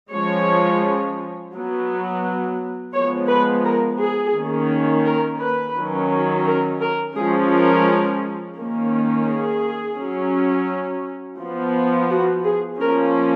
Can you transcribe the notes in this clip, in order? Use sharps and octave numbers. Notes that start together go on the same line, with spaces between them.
F3 G#3 C#4 C#5
F#3 B3
F3 G#3 B3 C#5
B4
A#4
G#4
D#3 A#3 C#4
A#4
B4
D#3 F#3 C#4
A#4
A#4
F3 G#3 C#4 G#4
A#4
D#3 A#3 C#4
G#4
F#3 C#4
F3 B3
F#4
G#4
F3 A#3 C#4 A#4